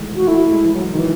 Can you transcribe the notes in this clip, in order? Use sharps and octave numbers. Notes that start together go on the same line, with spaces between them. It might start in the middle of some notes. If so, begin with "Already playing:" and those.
Already playing: D#3 E3 G#3 A3
F#4
A3 E4
G#3
E3
F#3
D#3
E3